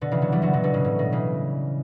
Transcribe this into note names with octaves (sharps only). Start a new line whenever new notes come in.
B2 D3
C#3 E3
D3 F#3
E3 G3
D3 F#3
B2 D3
B2 D3
A2 C#3
A2
B2
C#3 E3